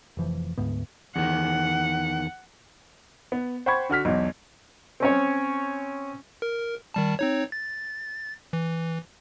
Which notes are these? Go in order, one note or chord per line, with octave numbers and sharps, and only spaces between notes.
F1 E3 F3
D2 G#2 B3
E2 D#3 F#5
B3
C5 F#5 G5 B5 C#6 G#6
D3 F#4 F6 B6
B1 E2
C4 C#4 C#5
A#4
D#3 G3 A5
C4 D#4 C#5
A6
E3